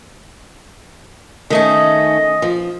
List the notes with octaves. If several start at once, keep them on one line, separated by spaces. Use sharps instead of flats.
D#3 A3 C#4 D#5
F3